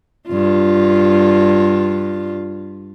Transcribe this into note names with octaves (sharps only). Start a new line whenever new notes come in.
G2 F4